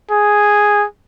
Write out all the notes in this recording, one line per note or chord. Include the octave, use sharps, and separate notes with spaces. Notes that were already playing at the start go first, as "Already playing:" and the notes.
G#4